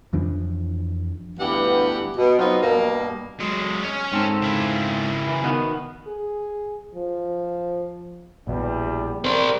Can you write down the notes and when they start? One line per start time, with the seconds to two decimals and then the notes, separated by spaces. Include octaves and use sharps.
0.13 F2 E3 F3 D4
1.38 D2 G2 E3 B3 G4 F#5
2.17 B2
2.38 F3 F#3 B3 C4 D#4 F4
2.61 G2 B2 A#3
3.40 F#3 G#3
3.83 C#4 C#5
4.12 G#2 C4 A4
4.42 C#3 E4
5.28 E3
5.43 B2 D#3 B3
6.07 G#4
6.95 F3
8.47 A#1 E2 B2 E3 G3
9.25 G3 C4 A#4 C5